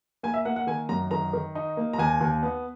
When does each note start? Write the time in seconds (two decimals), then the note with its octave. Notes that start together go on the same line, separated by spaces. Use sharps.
0.23 A#3 G#5
0.34 E5
0.45 A#3 F#5
0.56 F#5
0.67 D#3 G#5
0.89 F#2 A#5
1.11 D#3 A#5
1.33 D#3
1.55 D#4
1.77 A#3
1.93 A#5
1.98 D#2 G#5
2.21 D#2
2.43 B3